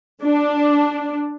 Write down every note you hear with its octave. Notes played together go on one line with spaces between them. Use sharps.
D4